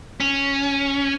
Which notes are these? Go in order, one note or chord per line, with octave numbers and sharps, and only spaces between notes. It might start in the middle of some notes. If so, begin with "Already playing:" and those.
C#4